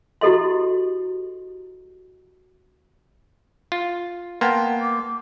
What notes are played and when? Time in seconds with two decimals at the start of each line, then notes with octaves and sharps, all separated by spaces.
0.21 E4 F#4 G4 A4 D#5 C6
3.72 F4
4.41 A#3 B3 F#5 G5 A5 C6
4.81 D6